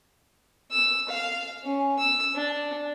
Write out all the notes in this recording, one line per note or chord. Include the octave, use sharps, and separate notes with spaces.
E6
F5
C#4
E6
D4